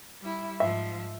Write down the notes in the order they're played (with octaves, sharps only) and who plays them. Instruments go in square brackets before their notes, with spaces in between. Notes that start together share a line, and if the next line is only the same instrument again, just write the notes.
[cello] G3 E4
[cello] G#2 F3 [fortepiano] E5